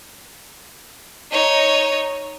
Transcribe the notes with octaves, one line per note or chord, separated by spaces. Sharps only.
D#4 C#5